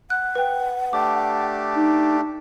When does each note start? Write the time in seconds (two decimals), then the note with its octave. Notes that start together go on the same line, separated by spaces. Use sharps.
0.10 F#5 F#6
0.35 B4 G5
0.93 A3 D4 G4 D6
1.76 D#4